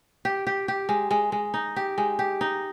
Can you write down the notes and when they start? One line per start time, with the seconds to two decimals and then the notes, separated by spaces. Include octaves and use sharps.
0.25 G4
0.47 G4
0.68 G4
0.89 G#3
1.11 G#3
1.32 G#3
1.54 D#4
1.76 G4
1.98 G#3
2.19 G4
2.41 D#4